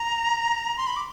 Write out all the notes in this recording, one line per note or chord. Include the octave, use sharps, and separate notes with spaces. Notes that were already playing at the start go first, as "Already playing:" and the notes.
Already playing: A#5
C6
B5
D6